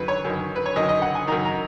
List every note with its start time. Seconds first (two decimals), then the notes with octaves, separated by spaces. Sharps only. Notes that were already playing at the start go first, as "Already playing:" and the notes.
Already playing: F#2 D#3 B4
0.08 C#5
0.24 F#2 D#3
0.56 B4
0.66 C#5
0.76 F#2 D#3 D#5
0.89 D#5
1.02 F#5
1.15 G#5
1.27 F#2 D#3 A#5
1.45 A#5